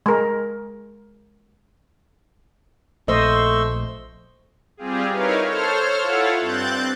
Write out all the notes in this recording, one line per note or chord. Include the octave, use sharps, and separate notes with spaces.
G#3 A#4
A#1 A3 C5 D#5 C6 C#6 E6
G3 C4 F4 G4 G#4
D#4 E4 A#4 B4 C#5 F5
A4 C5 C#5 F6
E4 F4 A4 C#5 F5 F#5
G2 C4 F#6 G6 A6